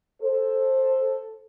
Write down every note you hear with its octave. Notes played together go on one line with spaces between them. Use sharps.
A4 C5